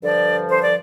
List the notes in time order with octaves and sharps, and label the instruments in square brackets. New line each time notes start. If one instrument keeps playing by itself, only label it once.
[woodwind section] G2 D3 F3 D5
C5
D5